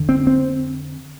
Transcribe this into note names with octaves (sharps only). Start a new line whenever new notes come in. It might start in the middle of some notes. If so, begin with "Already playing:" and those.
Already playing: F2 D3
C4
C4